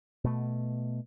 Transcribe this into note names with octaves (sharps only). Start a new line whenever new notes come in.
B2 A3